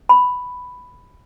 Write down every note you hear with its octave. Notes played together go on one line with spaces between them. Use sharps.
B5